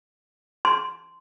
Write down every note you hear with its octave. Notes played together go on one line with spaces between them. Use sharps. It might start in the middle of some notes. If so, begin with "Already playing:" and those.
C6